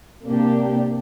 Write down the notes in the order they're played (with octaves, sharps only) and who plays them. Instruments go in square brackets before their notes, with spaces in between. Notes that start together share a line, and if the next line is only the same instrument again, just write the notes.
[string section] C3 A#3 D4 G4